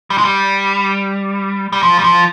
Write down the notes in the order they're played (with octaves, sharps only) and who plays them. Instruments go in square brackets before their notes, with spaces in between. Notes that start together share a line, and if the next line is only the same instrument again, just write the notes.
[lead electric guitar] G3
G#3
G3
G3
F3
G3
F3